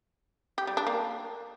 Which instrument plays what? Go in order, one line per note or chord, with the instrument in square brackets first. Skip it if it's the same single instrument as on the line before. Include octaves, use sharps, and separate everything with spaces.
[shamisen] G4
G3
D4
A#3